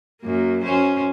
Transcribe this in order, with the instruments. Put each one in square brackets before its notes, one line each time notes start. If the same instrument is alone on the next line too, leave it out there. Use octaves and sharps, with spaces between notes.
[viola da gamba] F#2 A#3
F#2 C#4 C5